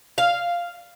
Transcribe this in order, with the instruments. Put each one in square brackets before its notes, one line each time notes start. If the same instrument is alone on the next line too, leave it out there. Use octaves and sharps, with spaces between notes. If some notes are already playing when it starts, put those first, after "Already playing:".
[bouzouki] F5